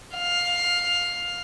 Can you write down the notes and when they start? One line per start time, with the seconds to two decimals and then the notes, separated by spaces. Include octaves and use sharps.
0.15 F5